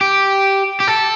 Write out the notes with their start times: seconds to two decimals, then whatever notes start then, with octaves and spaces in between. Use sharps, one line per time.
0.01 G4
0.80 G4
0.88 A4